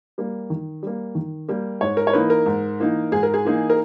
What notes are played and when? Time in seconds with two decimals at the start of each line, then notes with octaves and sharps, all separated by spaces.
0.18 G3 A#3
0.50 D#3
0.83 G3 A#3
1.15 D#3
1.49 G3 A#3
1.81 G#2 C#5
1.97 A#4
2.07 C#5
2.13 E3 A#3 D#4 B4
2.30 A#4
2.46 G#2
2.80 E3 A#3 D#4
3.12 G#2 G#4
3.23 A#4
3.34 G#4
3.45 E3 A#3 D#4
3.70 A#4